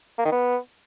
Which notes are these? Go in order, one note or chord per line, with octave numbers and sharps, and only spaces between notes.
A#3
D#3
B3